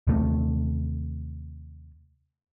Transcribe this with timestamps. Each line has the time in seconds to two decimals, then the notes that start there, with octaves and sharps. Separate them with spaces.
0.07 D#2 C3 A3